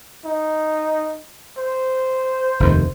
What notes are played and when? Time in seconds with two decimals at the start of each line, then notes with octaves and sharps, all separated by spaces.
0.25 D#4
1.58 C5
2.60 F1 D#2 D#3